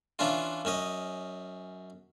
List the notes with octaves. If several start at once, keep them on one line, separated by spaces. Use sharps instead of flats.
E3 C#4 D4 F4
F#2 C#4 D#5